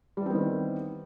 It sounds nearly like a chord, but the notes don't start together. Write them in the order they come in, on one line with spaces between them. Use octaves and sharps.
G3 E3 C4 B3 D#3